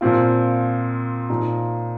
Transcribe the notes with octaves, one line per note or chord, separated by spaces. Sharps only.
A#2 F3 C4 F4
A#2 F3 D#4